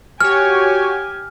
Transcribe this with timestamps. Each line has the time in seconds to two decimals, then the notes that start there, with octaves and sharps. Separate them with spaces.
0.21 F#4 G4 C#5 G#5 F6